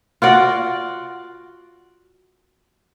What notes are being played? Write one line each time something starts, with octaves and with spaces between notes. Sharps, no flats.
F4 F#4 D5